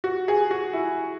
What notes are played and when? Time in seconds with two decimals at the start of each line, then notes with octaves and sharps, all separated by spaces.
0.04 F#4
0.28 G#4
0.51 F#4
0.73 E4